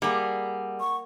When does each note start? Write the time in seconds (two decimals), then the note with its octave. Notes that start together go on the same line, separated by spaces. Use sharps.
0.02 G3 A#3 G#4 F#5
0.80 C#6